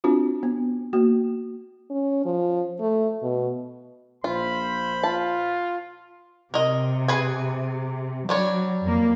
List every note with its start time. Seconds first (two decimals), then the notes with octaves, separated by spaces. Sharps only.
0.04 C4 D4 F4 F#4
0.43 B3
0.93 A#3 F#4
1.90 C#4
2.25 F3
2.80 A3
3.23 B2
4.24 A#1 F4 C5 B5
5.04 F4 A5
6.54 C3 A#4 D#5
7.08 G#4 B4 G#5
8.29 F#3 G3 D4 C#5
8.83 F2 A#3